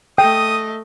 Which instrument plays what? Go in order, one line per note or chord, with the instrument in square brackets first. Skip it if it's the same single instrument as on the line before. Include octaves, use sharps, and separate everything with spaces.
[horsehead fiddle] A3 D#5 [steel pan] G5 [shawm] D#6